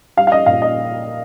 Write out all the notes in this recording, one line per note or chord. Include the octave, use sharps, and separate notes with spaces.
G3 F5
F5
D#5
A#2 F5
D#5